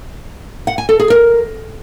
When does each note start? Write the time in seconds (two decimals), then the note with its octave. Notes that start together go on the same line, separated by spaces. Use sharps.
0.67 F#5
0.78 G#5
0.89 A4
1.00 G#4
1.10 A#4